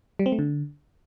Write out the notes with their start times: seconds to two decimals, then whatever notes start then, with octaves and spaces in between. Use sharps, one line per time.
0.19 G3
0.26 C4
0.32 A3
0.39 D3